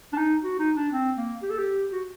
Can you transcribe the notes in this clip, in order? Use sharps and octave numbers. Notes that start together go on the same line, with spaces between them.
D4
D#4
F#4
D#4
D4
C4
A#3
G4
A4
G4
F#4